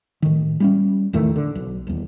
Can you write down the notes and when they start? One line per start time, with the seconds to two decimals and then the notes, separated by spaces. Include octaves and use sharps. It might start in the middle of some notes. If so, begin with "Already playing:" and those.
0.22 A2 D#3
0.60 G3 C4 C#4
1.13 E2 A2 D#3 A3
1.36 D3
1.55 B1
1.87 D#1 E2